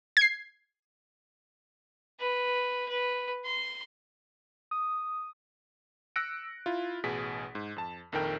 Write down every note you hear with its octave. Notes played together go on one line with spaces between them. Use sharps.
G#6 C7
B4
B4
C6
D#6
E6 F#6 A#6 C#7 D7
E4 F4
A1 B2 G#4 B6
G#2
F2 A5
A#1 F2 D#3 A4 A#4 G5